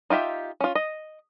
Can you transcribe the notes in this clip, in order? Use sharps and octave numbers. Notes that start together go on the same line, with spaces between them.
D#4 F4 G4 E5
C#4 F4
D#5